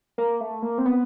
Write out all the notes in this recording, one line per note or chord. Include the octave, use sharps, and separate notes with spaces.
A#3
A3
A#3
C4
B3